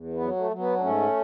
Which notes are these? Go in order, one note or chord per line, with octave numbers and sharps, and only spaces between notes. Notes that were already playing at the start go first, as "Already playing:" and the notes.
Already playing: E2
B3
F#3
A3
F#3
B3
D4
G#2 A3 C#4